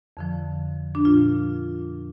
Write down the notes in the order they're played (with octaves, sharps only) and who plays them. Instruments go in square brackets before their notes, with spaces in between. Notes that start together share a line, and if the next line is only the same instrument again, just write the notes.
[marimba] F2 D3 F3
D4
A#2 F3 F4